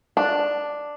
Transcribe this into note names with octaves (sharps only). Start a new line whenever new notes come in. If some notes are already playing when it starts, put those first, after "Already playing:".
D4